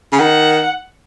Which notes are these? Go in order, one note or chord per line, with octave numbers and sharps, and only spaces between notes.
C#3
D#3 F#5